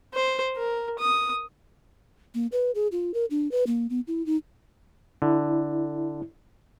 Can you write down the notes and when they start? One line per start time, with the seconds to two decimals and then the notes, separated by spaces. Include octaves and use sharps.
0.13 C5
0.57 A#4
0.99 D#6
2.34 A#3
2.52 B4
2.75 G#4
2.92 F4
3.14 A#4
3.30 D4
3.51 B4
3.67 A#3
3.90 B3
4.07 E4
4.26 D#4
5.22 D3 E4